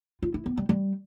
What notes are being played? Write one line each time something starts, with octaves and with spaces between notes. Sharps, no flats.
F4
E4
B3
G3
G3